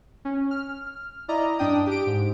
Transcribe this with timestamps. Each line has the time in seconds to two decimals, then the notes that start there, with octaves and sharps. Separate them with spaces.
0.25 C#4
0.51 F6
1.28 E4 D5 D#5 A#5
1.59 G2 D4 G5 D#6
1.87 G4 D7
2.06 G#2